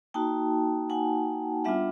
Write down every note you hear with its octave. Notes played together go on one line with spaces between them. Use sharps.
A#3 D#4 F#4 G5 A5
F#5 G#5
G3 B3 D4 F4 E5 F#5